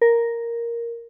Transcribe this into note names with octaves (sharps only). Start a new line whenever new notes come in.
A#4